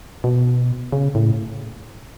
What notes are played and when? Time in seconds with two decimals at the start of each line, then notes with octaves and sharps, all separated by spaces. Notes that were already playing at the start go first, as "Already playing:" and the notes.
0.24 B2
0.92 C#3
1.15 A2